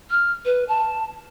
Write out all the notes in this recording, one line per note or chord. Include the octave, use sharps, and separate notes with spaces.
F6
B4
A5